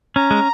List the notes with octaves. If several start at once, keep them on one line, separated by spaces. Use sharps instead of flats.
C#4 A#5
G#3